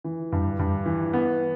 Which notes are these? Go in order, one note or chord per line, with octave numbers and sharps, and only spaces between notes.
E3
G2
G2
E3
B3